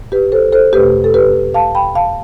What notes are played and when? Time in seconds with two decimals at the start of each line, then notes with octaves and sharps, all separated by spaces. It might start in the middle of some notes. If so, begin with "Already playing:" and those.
Already playing: A2
0.12 G4 B4
0.32 A4 C5
0.52 A4 C5
0.73 E2 B2 A3 G4 B4
1.04 A4
1.14 G4 B4
1.54 F5 A5
1.75 G5 B5
1.95 F5 A5